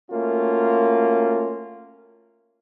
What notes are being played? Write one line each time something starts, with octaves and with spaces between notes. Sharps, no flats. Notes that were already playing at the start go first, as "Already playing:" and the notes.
A3 A#3 C#4 F4 F#4